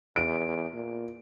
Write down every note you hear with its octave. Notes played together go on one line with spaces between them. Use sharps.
E2 D7
A#2